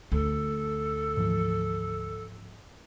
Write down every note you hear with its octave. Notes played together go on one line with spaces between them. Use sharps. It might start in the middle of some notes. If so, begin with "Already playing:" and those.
D2 A4
G#2 E3 F3